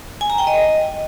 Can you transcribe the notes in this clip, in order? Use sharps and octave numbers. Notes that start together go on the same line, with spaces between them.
G#5
A#5
G5
D#5